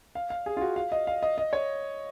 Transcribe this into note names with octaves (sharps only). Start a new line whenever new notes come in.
F5
F5
G#4
F4
F#4
F5
D#5
F5
D#5
D#5
C#5